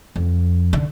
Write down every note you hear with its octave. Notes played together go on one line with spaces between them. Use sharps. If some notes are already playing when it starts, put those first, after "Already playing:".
F2
D3